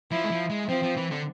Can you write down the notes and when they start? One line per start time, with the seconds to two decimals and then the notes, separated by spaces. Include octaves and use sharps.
0.11 F3 E4
0.24 G#3
0.31 F3
0.50 G#3
0.69 F3 C4
0.83 F3
0.97 E3
1.11 D3